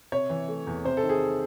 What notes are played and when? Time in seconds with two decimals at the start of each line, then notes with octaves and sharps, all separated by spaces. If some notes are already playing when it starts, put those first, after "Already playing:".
0.12 C3 C#5
0.30 E3
0.48 A3
0.67 E2
0.85 C3 C5
0.97 A4
1.03 D#3
1.09 G#4